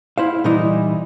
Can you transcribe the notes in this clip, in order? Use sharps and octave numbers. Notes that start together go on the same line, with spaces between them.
E4 C5 F5
A#2 E3 G3 D#4 E4